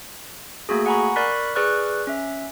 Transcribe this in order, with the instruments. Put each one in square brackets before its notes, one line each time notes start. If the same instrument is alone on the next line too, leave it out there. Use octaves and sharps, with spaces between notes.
[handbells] A3 A#3 F#4 G#4
F#5 G#5 A#5 B5 C#6
A#4 D5 B5 C#6 F#6 B6
G#4 B4 D5 C#6 F6 F#6
C#4 E5